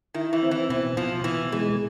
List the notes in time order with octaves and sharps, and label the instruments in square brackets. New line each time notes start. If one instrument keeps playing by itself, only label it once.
[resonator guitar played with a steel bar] D#3 [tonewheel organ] E4
[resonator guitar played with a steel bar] E3
[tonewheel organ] C4
[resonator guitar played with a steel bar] E3
[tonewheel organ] B2 [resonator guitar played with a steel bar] E3
[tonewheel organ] B2 [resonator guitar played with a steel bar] F3
[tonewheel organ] B2 [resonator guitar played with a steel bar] E3
[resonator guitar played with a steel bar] E3 [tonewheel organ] G#3